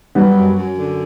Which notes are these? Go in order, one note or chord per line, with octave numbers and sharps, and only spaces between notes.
F#3 G3 B3
F#2
F#2
D3